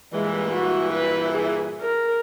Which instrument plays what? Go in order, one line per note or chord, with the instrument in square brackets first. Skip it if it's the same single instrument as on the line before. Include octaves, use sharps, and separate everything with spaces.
[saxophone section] G2 A#2 E3 [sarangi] G#3
[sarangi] F#4
B4
G#4
A#4